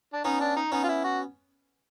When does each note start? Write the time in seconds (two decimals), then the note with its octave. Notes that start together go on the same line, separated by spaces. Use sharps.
0.13 D4
0.24 B3 C#4 D#4
0.41 D4
0.56 D#4
0.72 B3 C#4 D#4
0.84 F4
0.88 E4
1.04 F#4